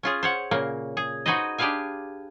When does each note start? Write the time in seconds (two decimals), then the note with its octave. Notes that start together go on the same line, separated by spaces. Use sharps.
0.03 C#4 F4 G#4
0.23 C5 C#5 F#5
0.51 A#2 C#3 A#3
0.97 G#4
1.26 D#4 F#4 G#4 B4 C5 D#5
1.58 D4 G4 G#4 B4 F5 G#5